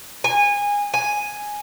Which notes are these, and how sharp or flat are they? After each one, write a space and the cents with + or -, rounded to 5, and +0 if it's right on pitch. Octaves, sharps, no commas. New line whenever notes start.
G#5 -20
G#5 +0